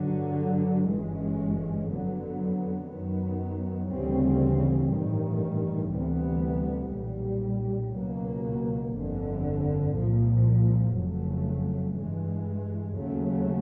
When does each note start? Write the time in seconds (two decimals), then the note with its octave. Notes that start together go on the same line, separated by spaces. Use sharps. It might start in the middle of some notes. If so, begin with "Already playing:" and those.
Already playing: G2 D3 F#3
0.87 G1 G2 E3 G#3 C#4
1.87 F2 D3 F#3 B3
2.89 F#2 D#3 F#3 B3
3.89 D2 C#3 E3 G3 C4
4.90 A1 G2 D#3 G3
5.90 D2 C3 E3 G3 B3
6.92 B1 A#2 G3
7.93 C#2 B2 F#3 A#3
8.93 G1 F2 D3
9.93 C2 A#2 F3
10.94 F1 F2 C#3 F#3 A3
11.95 G2 E3 G#3
12.96 D#2 C#3 F#3 A3